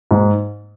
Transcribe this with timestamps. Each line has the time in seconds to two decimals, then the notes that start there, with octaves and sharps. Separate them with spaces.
0.11 G#2